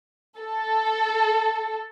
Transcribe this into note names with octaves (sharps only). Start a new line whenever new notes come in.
A4